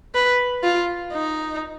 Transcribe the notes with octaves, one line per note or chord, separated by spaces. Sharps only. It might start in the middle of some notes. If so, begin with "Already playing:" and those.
B4
F4
D#4